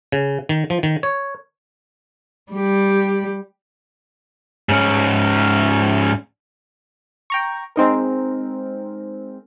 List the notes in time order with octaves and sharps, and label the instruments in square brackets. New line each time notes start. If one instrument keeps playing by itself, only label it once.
[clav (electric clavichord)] C#3
D#3
F3
D#3
C#5
[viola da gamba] G3 G4
[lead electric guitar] G#2 C#4
[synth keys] G5 A#5 C#6
G#3 C4 D#4 A#4